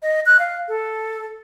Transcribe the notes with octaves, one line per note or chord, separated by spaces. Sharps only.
D#5
F#6
F5
A4